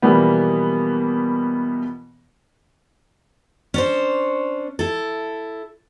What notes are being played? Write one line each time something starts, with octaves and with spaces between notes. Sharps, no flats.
B2 E3 F3 G3 A#3 B3
C#4 D4 C5
E4 A4